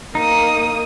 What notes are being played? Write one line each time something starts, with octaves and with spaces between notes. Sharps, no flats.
A#3 D#4 D#6